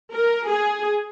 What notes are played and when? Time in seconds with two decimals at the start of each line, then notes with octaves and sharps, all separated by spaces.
0.12 A#4
0.48 G#4